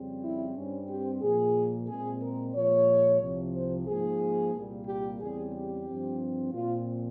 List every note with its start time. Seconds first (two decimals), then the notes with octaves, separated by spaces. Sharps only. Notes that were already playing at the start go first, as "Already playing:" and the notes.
Already playing: F2 C#3 G3 C4
0.23 E4
0.56 G2 G3 C4 C#4
0.89 G4
1.22 A#2 F3 A#3 G#4
1.88 A#2 G#3 C4 G#4
2.22 A#4
2.55 A#2 F3 G#3 C#5
3.22 C2 C3 F3
3.55 C5
3.88 G#2 F3 A#3 G#4
4.54 C2 A#2 G3 A#3
4.87 G4
5.20 E2 C#3 G3 C4 G#4
5.53 G4
5.86 G2 F3 C4
6.52 A#2 F3 C4 F4